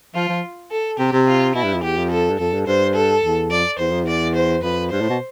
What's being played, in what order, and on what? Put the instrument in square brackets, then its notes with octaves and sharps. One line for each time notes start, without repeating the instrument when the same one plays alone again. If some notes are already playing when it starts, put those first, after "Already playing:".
[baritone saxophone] F3 [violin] F4
[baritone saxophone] F3
[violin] A4
[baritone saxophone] C3 [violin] G4
[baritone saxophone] C3
[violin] F4
[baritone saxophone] B2 [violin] E4
[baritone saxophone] G2
F2
[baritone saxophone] E2 [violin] G4
[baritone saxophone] F2
[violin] A4
[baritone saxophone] G2
[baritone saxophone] F2 [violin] A4
[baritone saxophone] G2
[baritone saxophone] G2 [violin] C5
[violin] A4
[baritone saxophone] E2
[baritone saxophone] F2 [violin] D5
[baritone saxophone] E2 [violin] C5
[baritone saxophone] F2
[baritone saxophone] E2 [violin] D5
[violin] C5
[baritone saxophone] F2 [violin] B4
[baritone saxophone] G2 [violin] C5
[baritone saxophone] A2
B2